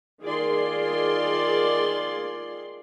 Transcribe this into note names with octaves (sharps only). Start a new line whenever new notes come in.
D#3 F4 G#4 D5 C6